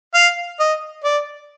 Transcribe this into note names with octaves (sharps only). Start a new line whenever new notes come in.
F5
D#5
D5